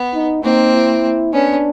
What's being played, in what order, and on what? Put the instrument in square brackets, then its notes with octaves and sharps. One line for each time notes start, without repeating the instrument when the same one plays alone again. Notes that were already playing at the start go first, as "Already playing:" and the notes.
Already playing: [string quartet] B3
[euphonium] D#4
[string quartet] A#3 C4 [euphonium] D#4
[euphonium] E4
[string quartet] B3 C#4 [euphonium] D4